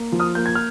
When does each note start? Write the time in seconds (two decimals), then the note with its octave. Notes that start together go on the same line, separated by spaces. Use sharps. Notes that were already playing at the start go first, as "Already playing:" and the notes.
Already playing: A#3
0.12 F3
0.20 D#6 F6
0.35 A#3 G6
0.46 G#6
0.55 F6